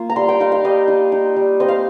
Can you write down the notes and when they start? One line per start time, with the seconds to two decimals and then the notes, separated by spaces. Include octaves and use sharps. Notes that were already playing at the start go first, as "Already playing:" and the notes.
Already playing: A#3 F4
0.10 A#5
0.16 G3 C6
0.29 G5
0.40 D#4 F5
0.52 F5
0.64 G3 D#5
0.88 D#4
1.12 D#4
1.36 G3
1.60 C4 D#5
1.68 F5